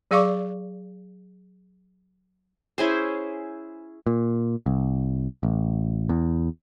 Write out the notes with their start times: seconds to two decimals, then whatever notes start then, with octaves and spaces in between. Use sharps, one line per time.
0.11 F#3 G#4 D5 F5 C#6 D6
2.78 C#4 E4 G#4 C5
4.07 A#2
4.66 C2
5.43 A1
6.09 E2